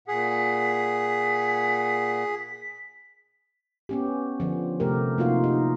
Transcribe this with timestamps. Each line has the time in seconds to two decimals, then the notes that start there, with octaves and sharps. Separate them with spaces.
0.08 A#2 G#4 F#5 B6
3.89 B3 C#4 G4
4.40 D3 F3
4.80 C3 A3 G4 A#4
5.18 C3 A#3 D#4 F4 F#4 F5
5.44 D#4